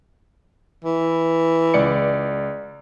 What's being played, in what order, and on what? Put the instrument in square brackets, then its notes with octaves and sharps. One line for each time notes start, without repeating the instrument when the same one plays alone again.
[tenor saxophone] E3
[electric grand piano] C#2 D5 C#7